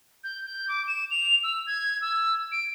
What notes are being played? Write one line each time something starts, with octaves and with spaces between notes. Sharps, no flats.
G6
G6
D6
E7
F7
E6
G#6
E6
D7